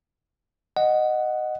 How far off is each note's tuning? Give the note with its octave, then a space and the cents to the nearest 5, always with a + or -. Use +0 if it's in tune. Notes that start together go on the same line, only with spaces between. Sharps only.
D#5 -10 F#5 +0